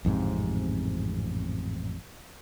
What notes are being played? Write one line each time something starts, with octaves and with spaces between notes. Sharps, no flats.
A1 F2 G#2 C3